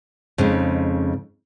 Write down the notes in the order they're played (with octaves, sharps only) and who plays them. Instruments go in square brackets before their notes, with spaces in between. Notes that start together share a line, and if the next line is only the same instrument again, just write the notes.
[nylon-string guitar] F2 C#3 G#3 D#4